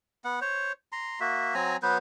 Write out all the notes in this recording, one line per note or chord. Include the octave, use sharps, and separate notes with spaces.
B3 F#5
C5 C#5
A#5 C6
A#3 F#4 E5
F#3 C4 G#5 A#5
F#3 B3 B4 C5